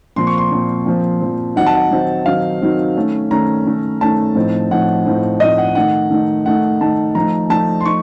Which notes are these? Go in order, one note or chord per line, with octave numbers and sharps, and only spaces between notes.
A#2 F3 C4 C6
C#6
C6
A#2 F3 C4
A#2 F3 C4
A#2 F3 C4
D#3 F#3 C4 D#4 F#5
A5
F#5
D#3 F#3 C4 D#4
D#3 F#3 C4 D#4 F5
D#3 F#3 C4 D#4
D#3 A3 C#4
D#3 A3 C#4 A#5
D#3 A3 C#4
D#3 A3 C#4 A5
A2 F3 C4 D#4
A2 F3 C4 D#4 F#5
A2 F3 C4 D#4
A2 F3 C4 D#4 D#5
F#5
D#3 A3 D#4 F#5
D#3 A3 D#4
D#3 A3 D#4 F#5
D#3 A3 D#4 A5
F3 A3 D#4 A#5
F3 A3 D#4 A5
C6
D#4 C#6